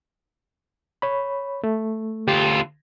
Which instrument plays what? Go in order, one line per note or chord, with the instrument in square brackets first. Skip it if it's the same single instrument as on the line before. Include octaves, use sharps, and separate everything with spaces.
[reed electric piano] C#5 B5
A3
[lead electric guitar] D2 F4 [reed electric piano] G4